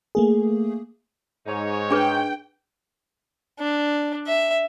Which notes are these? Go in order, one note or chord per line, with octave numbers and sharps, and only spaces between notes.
A3 A#3 G#4
G#2 D#4 C#5
D4 G#4 B4 G5
D4
E5